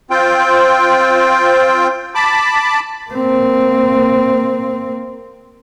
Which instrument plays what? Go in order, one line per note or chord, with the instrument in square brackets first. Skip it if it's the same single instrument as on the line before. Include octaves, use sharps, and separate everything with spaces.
[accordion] C4 F4 G5
A5 B5 D6
[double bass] A#3 C4